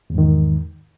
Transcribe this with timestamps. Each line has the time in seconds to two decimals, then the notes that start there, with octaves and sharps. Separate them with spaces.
0.10 E2
0.14 G#2
0.18 D#3